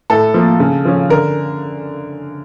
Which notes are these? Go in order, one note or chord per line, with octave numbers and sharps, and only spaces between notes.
A2 A4
F3 A#3
C#3
F3 C#4
D3 A#4